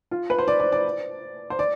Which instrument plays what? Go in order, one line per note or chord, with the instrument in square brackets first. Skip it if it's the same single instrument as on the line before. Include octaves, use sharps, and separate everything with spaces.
[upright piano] F4
B4
C5
D5
D5
D5
C5
D5